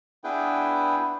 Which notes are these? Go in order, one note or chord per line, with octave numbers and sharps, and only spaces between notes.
B3 D4 E4 G#4 B4 G5